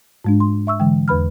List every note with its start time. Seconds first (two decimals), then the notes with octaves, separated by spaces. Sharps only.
0.24 G#2 G#3 D4
0.40 C6
0.67 E5 C#6 E6
0.80 D3 E3 G#3 G5
1.08 E2 B4 B5 F6